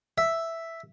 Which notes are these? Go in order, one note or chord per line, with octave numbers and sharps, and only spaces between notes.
E5